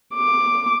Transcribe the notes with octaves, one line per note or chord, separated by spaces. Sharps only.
D6